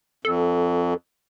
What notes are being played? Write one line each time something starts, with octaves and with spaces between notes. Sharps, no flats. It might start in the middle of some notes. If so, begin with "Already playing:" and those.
F2 A4